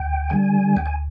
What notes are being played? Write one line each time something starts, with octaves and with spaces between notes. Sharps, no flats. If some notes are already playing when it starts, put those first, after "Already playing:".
Already playing: D2 G5
D3 G3 G#5
D2 G5
G#5